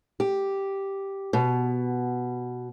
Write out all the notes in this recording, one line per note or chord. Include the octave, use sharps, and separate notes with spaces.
G4
B2